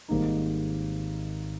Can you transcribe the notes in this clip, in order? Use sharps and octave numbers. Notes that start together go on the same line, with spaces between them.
G#1 G#2 G3 A#3 D#4